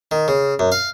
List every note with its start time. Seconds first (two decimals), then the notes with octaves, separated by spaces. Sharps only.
0.11 D#3
0.28 C#3
0.59 F#2
0.72 F5